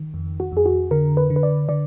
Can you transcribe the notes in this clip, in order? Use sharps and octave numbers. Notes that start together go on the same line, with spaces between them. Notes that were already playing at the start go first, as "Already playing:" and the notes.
Already playing: D#3
F2
F#4
F2 G#4
F#4
D3 A#4
B4
D3
B4
D5
D3 D5